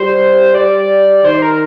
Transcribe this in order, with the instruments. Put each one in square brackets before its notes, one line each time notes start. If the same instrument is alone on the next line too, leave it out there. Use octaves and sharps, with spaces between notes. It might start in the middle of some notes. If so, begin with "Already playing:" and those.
Already playing: [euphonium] G3 [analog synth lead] C5
[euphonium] G3 [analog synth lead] D5
[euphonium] D#3 [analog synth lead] C5
[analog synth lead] A#4